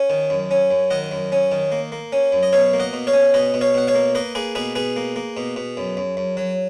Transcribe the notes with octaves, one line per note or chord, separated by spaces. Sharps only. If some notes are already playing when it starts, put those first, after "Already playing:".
Already playing: C#4
D#3
F#2
C#4
F#2
D#3 D#5 F#5
F#2
C#4
D#3
A#3
A#3
C#4
F#2
D#5
B2 C#5 F5
A#3
D#5 F#5
B2
C#5 F5
C#4
B2 B4 D#5
B2
C#5 F5
B2 F#5
C#5 F5
A#3
A#3 B4 D#5
A#3 G#4 B4
B2 G#4 B4
B2 G#4 B4
A#3
A#3
B2
B2
F#2
F#2
F#2
F#3